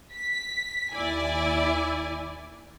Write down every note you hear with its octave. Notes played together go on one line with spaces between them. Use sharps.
B6
D#2 E4 D5 G#5